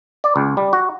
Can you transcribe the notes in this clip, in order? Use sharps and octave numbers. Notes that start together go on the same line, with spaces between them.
D5
C#2
G3
F#4